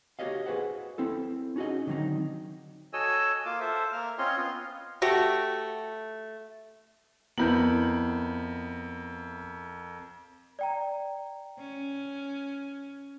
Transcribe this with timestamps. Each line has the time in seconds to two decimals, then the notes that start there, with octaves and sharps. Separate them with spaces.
0.19 F#4 G4 A#4 C#5 D#5 F5
0.46 F#4 G#4 B4 C5 F#5
0.98 C4 E4 A4
1.56 C#4 D#4 F#4 G#4 D#5
1.87 D3 D#3 F#3 C4 D#4
2.93 F#4 A4 C#5 D#5 G#5 E6
3.45 A#3 F4 D6
3.60 A4 C5 E5
3.93 A#3 A#4 F6
4.18 C4 C#4 F4 C#5 D#5 C6
4.37 B3 F4
5.02 A3 F#4 G4
7.38 F2 B3 E4 A#4 G6 F#7
10.59 D5 G5 A#5
11.59 C#4